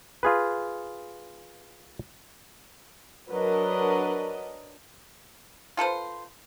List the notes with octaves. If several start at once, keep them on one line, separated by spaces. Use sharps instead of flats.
F4 G#4 B4
F#3 D4 A#4 B4 D#5
F4 A4 B4 C5